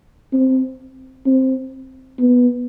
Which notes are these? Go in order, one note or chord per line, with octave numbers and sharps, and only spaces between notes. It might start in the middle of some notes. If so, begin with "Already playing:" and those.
C4
C4
B3